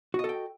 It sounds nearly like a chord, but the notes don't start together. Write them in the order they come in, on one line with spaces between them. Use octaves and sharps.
F#4 D#5 A4 G5